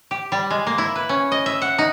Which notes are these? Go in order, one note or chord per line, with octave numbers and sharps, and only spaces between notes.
G4
G3
G#3
A#3
E4
B4
C#4
D#5
E5
F#5
D#4